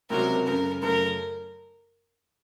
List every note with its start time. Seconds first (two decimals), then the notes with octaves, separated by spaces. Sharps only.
0.10 C#2 C3 F#3 C4 F#4 A#4
0.46 F#2 C#3 A3 A#4
0.82 F#2 C#3 A3 A#4